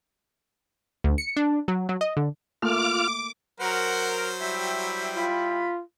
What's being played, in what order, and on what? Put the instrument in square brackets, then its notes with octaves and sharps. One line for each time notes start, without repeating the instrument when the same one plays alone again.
[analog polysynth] D2
C#7
D4
F#3
F#3
D#5
D3
[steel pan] A3 A#3 [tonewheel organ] F4 F6 [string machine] D6
[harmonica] F#3 C5 [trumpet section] A#4 [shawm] F#5
[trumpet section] G3 E4 G5 [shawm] E5
[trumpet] F4 [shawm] B5